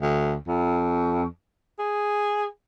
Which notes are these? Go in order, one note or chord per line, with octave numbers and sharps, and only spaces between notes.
D2
F2
G#4